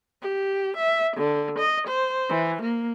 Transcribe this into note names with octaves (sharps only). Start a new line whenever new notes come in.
G4
E5
D3
D#5
C5
E3
A#3